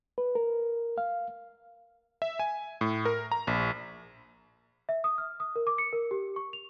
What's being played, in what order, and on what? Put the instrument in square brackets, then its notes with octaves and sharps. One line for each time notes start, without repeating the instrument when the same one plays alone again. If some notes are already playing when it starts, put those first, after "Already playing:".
[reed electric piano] B4
A#4
F5
[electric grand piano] E5
G#5
A2
A#4
A#5
A#1
[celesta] E5
D#6
F6
D#6
A#4
D6
C#7
A#4
G4
C#6
F7